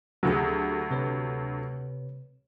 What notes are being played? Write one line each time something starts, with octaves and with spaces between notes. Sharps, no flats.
D2 F#3 C4 G4 G#4
C3 B4 C#5